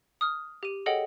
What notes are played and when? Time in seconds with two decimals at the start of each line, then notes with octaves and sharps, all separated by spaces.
0.21 D#6 F6
0.63 G4 D#7
0.86 G#4 A4 C#5 D#5 F#5 G5